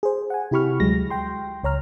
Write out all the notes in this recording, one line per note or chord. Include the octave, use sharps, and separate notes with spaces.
G#4 C5
F#5 G#5
C3 E4 G4 B5 C#6 F6
D2 F#3 G#3 A#6
G5 C6
C#2 C#5 A#5 F6